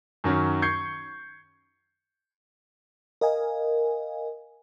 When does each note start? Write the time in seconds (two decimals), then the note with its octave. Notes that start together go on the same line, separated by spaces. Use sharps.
0.24 F#2 D#3 F#3 C#4
0.62 C#6 G6 G#6 C7 C#7
3.21 A#4 D#5 F5 G#5